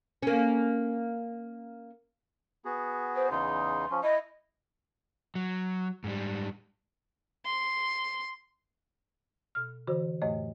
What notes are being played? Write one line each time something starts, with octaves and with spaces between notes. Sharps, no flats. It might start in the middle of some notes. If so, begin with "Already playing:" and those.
A#3 C#4
B3 F#4 G#4
C5
E2 C#3 D#4 C6
F3 C#4
E4 D#5
F#3
G#2 G3
C6
B2 F6
D3 E3 F#4 C5
F2 A2 A3 C#5 D#5